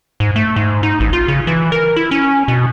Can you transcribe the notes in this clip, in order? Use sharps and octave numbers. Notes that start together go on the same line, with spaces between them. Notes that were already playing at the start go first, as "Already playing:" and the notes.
G#2
A3
G#2
D#4
A1
F4
C#3
E3
A#4
E4
C#4
B2